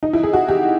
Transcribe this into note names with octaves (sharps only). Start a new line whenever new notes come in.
D#4
E4
G#4
F#4
G4